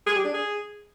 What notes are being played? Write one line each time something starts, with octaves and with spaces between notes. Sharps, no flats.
G#4
G4
D4
G#4